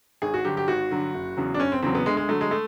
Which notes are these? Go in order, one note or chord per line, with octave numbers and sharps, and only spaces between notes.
G#1 G#4
F#4
G2 D3 F#3 G4
G4
G#1 F#4
G2 D3 F#3
F#1
E2 C#3 F#3
D4
F#1 C#4
C4
E2 C#3 F#3 C4
B3
D2 G#3
G#3
D3 F#3 A3
G#3
A3